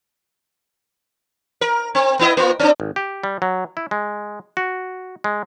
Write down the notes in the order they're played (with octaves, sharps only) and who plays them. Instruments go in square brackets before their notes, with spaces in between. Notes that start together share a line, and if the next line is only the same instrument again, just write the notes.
[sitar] A#4
C4
B3 E4 D#5
A#3 F4
C4 D4
[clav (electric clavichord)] G#1
G4
G3
F#3
E4
G#3
F#4
G#3